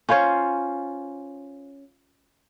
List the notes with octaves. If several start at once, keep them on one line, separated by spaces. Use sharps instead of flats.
C#4 F4 C5 C#5